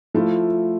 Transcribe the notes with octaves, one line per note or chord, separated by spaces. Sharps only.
F3 A3 E4 F4